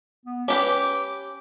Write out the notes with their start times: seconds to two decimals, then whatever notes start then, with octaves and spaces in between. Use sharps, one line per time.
0.25 B3
0.48 C#4 G4 B4 D6